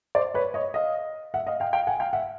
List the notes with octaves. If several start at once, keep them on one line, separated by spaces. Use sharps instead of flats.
C5 D5
B4 C#5
C#5 D#5
D#5 F5
E5 F#5
D#5 F5
F5 G5
F5 G5
F#5 G#5
F5 G5
E5 F#5